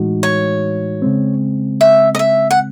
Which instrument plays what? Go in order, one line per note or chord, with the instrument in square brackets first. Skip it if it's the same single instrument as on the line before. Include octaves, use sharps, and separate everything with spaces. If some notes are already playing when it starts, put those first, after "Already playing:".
Already playing: [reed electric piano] A2 E3 G#3 D#4 F#4
[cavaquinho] C#5
[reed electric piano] C#3 G#3 C4
[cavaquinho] E5
D#5
E5
F#5